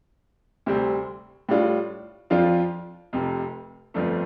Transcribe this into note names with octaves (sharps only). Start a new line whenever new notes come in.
D2 C3 G3 C4
A2 G3 D4 F4
F2 F3 D4 F4
F1 F2 C3
G1 F2 F3 A3 D4